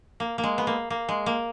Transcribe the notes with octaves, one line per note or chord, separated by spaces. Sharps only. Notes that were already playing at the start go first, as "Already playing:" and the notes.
A#3
A#3
G#3
B3
A#3
A#3
G#3
A#3